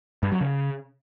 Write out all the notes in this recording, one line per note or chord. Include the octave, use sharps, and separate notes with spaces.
G2
F#3
C#3